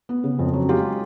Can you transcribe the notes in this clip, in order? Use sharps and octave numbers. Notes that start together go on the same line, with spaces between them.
B3
C#3
F2
F#3
G#3 F4 G4